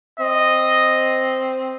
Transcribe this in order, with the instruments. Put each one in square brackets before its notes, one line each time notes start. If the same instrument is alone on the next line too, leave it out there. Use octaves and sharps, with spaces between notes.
[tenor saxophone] C4 [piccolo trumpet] D#5